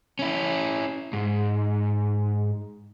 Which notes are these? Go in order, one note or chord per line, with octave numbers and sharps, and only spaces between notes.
C#4 E4
G#2